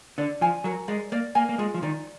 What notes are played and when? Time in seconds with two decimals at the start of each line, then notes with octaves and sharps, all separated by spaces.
0.18 D3 D5
0.41 F3 G#5
0.64 F#3 A#4
0.88 G#3 D5
1.12 A#3 D5
1.35 A#3 G#5
1.49 A#3
1.58 G#3 F4
1.74 F3
1.83 D#3 D5